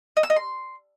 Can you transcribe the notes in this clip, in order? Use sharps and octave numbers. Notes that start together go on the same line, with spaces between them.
D#5
E6
D#5
C6